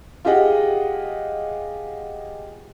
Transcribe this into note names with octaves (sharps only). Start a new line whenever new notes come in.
F4 G4 G#4 D#5 F#5